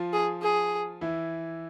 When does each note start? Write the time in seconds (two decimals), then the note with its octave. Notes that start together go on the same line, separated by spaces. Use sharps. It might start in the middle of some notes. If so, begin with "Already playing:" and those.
Already playing: F3 F4
0.13 G#4
0.42 G#4
1.01 E3 E4